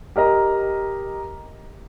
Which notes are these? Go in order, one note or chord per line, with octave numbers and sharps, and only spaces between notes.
G4 A#4 D#5 A#5